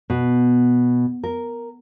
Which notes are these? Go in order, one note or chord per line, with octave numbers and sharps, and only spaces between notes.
B2
A#4